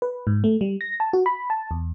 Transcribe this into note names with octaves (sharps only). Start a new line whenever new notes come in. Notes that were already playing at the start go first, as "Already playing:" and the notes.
B4
G#2
A3
G3
A#6
A5
F#4
B5
A5
E2